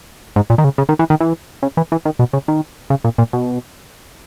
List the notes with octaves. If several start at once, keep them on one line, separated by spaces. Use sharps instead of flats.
G#2
A#2
D#3
C#3
C#3
D#3
E3
D#3
E3
C#3
E3
E3
D#3
B2
C#3
D#3
C#3
A#2
A#2
B2